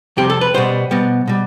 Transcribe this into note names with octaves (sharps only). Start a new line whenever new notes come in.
F2 C3 G3 C4 G4
A4
B4
B2 G3 B3 C5
B2 G3 B3
B2 G3